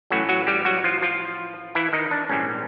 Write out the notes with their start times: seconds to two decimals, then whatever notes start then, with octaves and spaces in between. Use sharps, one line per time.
0.10 A2 E3 F#3 A3 C#4 F#4
0.29 F#3 F#4
0.47 G3 G4
0.65 F#3 F#4
0.84 F3 F4
1.02 F3 F4
1.75 E3 E4
1.93 D#3 D#4
2.11 D4
2.29 A#1 G#2 E3 G3 C4 C#4